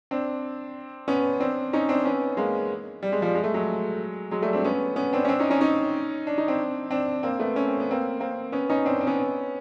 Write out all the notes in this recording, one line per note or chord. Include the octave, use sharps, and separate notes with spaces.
C4 D4
B3 C#4
C4 D4
C#4 D#4
C4 D4
B3 C#4
G#3 A#3
G3
G#3
F3 G3
G#3
A3
F#3 G#3
F#3 G#3
G3 A3
C4 D4
B3 C#4
B3 C#4
C4 D4
C#4
C4 D4
C#4 D#4
C#4 D#4
C#4 D#4
D4
D#4
C4 D4
C4 D4
A#3 C4
A3 B3
C#4
C4
B3
A#3 C4
A#3 C4
B3 C#4
C#4 D#4
C4 D4
C4
B3 C#4